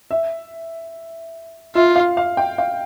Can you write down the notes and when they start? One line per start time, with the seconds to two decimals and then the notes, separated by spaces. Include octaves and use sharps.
0.11 E5
1.75 F4 E5
1.96 F5
2.17 F5
2.37 G5
2.58 F5